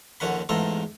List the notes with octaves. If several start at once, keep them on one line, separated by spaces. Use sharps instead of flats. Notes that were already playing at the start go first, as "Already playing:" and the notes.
A#1 D#2 D3 C#4 F#5 B5
A1 E2 G#2 F4 A4 A#5